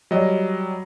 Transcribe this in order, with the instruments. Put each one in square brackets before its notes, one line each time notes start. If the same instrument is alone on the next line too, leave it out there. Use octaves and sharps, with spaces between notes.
[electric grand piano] F#3 G3 D#5